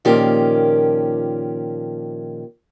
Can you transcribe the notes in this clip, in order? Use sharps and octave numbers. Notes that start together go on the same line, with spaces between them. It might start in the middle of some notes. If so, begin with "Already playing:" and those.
A#2 D#3 F3 A#3 C#4 G4